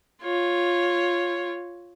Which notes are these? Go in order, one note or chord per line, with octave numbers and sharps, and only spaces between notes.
F4 C#5